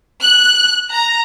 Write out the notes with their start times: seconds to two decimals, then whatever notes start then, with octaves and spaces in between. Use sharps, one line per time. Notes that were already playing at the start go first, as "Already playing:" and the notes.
0.18 F#6
0.89 A#5